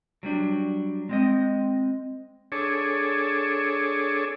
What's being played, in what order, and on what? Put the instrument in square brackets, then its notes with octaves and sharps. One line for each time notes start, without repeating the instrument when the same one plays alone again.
[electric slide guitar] F#3 G3 D4
G#3 C4 D#5
[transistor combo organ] D4 G#4 A4 C#5